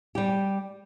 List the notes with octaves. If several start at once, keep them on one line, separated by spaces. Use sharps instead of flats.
G3 G4